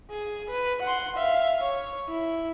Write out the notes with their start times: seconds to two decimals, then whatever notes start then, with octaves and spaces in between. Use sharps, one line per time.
0.10 G#4
0.50 B4
0.83 F#5 C6
1.17 E5 F5
1.63 C#5
2.09 E4